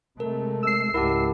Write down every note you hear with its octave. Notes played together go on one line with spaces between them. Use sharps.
C3 G#3 A3 A#4
E6 C7
C#2 G#2 E4 G4 A#4 F#5 A5